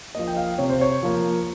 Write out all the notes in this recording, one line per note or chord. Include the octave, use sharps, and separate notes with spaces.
F3 A#3 D#5
G5
F5
C3 C#5
C5
C#5
F3 A#3